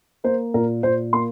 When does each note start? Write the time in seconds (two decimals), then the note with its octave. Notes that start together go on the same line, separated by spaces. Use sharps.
0.24 A#3 C5
0.54 A#2 A#4
0.83 A#2 C5
1.13 A#3 C6